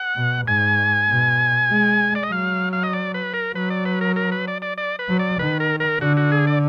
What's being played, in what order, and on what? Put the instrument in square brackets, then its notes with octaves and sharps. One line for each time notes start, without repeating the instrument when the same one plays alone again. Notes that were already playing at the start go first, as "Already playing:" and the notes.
Already playing: [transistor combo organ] F#5
[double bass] B2
[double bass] G#2 [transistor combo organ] G#5
[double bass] B2
G#3
[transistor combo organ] D5
D#5
[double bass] F#3 [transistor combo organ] F5
[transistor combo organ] F5
D#5
D5
B4
A#4
[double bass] F#3 [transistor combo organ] B4
[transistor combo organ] D5
B4
A#4
A#4
B4
D5
D5
D5
B4
[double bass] F#3
[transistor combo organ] D5
[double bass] D#3 [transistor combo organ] B4
[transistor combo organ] A#4
A#4
[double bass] D3 [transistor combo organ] F#4
[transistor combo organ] F#4
G#4
D5